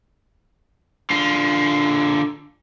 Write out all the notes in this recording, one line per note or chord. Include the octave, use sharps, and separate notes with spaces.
D3 F4